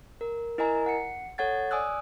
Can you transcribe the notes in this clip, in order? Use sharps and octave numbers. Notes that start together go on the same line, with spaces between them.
A#4
E4 A#4 D#5 G#5 A#5
F#5 C#7
A4 C#5 F#5 G#6 A6
D5 G#5 D#6 E6 F#6